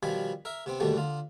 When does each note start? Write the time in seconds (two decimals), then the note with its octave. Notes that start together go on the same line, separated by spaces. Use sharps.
0.03 B2 D#3 F3 G3 G#5 B5
0.45 A#4 E5
0.66 C3 B3 C4
0.80 D#2 G#2 B2 D3 G3 A3
0.97 D3 F4